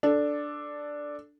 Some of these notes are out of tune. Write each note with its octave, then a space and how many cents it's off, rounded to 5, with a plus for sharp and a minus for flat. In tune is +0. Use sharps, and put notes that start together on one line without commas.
D4 +0 A4 +0